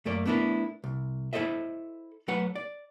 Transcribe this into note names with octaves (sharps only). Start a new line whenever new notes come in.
F#2 A3 A#3 D5
A3 B3 D4 E4 A#4
C2
E4 A4 C5 D#5 E5
F#3 A3 B4 F#5
D5